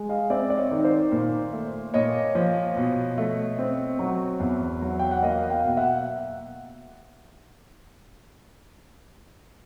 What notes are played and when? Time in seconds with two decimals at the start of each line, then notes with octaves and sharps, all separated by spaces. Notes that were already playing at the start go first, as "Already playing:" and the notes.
Already playing: G#3
0.09 D#5 F5
0.30 C4 D5 E5
0.50 D5
0.57 C#5 D#5
0.71 D#3
0.85 C5 D5
1.12 A#2
1.53 A3
1.94 A#2 C#5 D#5
2.35 F3
2.77 B2
3.18 A3
3.59 C4
3.99 F#3
4.40 E2
4.82 F#3
4.99 G5
5.11 F#5
5.22 A#3 D#5 F5
5.50 F5 G5
5.64 B2
5.77 E5 F#5